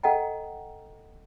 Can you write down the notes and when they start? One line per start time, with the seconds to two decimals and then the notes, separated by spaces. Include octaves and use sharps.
0.03 A4 D#5 F#5 G5 A#5